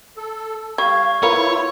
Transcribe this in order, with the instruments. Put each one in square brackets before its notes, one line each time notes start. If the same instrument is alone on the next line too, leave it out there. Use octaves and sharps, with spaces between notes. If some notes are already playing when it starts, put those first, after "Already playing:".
[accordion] A4
[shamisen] G3 [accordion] F5 [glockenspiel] C#6 G#6
[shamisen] B3 A#4 [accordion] E4 F4 [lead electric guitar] C#5